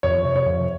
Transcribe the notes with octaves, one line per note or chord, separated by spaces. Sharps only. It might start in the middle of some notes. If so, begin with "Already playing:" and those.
F2 C#5
C3
C#5
F2